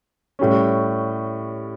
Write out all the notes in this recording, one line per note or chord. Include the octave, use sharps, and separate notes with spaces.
A2 G3 C#4